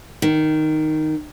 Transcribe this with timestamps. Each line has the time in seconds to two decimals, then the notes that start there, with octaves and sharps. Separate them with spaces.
0.22 D#3